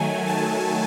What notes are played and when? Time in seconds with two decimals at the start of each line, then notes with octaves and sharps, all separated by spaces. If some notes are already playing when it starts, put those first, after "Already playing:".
Already playing: D#3 F#3 A3 G#5
0.28 A5